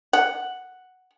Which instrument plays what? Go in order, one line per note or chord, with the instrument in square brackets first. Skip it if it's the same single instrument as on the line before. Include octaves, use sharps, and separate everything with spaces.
[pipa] F#5